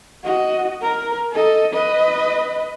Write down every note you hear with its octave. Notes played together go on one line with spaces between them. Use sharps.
F#4 D#5
A#4
A4 D#5
B4 D#5